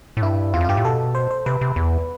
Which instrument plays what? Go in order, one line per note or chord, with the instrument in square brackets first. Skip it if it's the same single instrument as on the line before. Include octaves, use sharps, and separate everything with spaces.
[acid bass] A2
[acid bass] G2 [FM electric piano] E4
[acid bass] E2 [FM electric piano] F4
[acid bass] F2
[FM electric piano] F4
[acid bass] G2 [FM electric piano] G4
[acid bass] A2
[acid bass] B2 [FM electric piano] A4
[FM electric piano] C5
C5
[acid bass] C3 [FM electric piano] B4
[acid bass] C3
E2